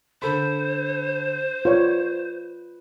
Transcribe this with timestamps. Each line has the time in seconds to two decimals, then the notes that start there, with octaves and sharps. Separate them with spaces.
0.22 D3 A4 C5 B5
1.65 F4 B4 C#5 D5